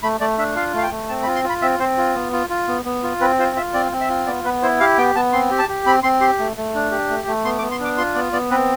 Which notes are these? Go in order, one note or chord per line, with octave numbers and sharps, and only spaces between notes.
A3 B5
A3 D5
D4 E5
F4 F5
A3 F5
G5
A3
C4 A5
B5
F4
C6
F4
B5
C4 E5
C4 C5
F4
B3
F4
F4
B3
B3
F4
C4 B4
F4 C5
F4 E5
C4 D5
C4
E5
F4
B3 D5
B3 B4
E4 C5
G4 F5
B3 G5
B3 A5
C4 C6
G4
A5
G4
C4 B5
C4 C6
G4 C6
A3
A3
D4
G4
A3
A3
B3 C6
D6
B3
C6
D4 D6
F4 C6
B3 D5
B3 D5
C4 B4